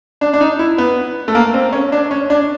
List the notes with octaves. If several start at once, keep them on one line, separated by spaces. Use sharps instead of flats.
D4
D4
D#4
E4
B3
A3
A#3
C4
C#4
D4
C#4
D4